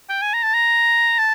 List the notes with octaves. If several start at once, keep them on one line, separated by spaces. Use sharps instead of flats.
G5
G#5
A#5
A5
A#5
A5